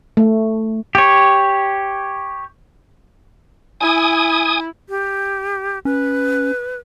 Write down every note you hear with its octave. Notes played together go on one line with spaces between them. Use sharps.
A3
G4 C#5
E4 G#5 D#6
G4
C#4 B4